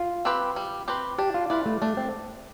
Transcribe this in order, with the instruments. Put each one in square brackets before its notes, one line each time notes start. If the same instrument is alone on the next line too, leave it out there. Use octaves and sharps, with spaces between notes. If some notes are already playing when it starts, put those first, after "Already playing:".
Already playing: [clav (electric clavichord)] F4
[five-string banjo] C4 G4 B4
G3
C4 G4 B4
[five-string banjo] D4 [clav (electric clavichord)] G4
[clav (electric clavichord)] F4
[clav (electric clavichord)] E4 [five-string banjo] F4 B4 D5
[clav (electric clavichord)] A3
[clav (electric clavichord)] A3 [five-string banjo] D4
[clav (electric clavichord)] C4